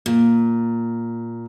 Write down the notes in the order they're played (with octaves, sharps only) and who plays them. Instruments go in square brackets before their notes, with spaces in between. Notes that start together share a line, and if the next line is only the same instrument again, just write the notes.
[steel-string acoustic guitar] A#2